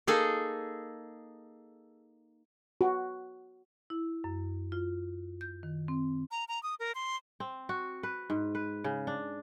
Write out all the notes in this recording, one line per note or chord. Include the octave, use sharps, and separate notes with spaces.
A#3 D#4 G#4 A4
F#4
E4
F#2
F4
G6
D#3
C4
A#5
A#5
D#6
A#4
C6
C4
F#4
B4
G#2
B4
C#3
D4